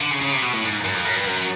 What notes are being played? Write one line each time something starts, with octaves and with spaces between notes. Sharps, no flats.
D3
C#3
C#3
C3
B2
A2
G#2
F#2
F2
F#2
G2
F#2